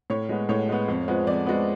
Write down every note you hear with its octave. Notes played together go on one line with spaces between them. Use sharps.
A2 C#5
G#3 B3
A2 C#5
G#3 B3
F2
F3 G#3 B3
F2 D5
F3 G#3 B3